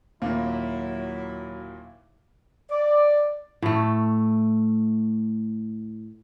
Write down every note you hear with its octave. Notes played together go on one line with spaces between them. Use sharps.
D#2 A#2 F#3 A#3 E4
D5
A2 A3